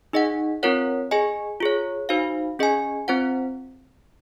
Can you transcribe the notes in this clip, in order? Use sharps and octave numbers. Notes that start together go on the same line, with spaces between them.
D#4 G#4 D#5 F#5
C4 F4 A#4 C#5 F#5
G#4 D#5 G#5
F4 G#4 C#5
D#4 F#4 C5 F5
C#4 G#4 D#5 G#5
C4 F4 C5 F#5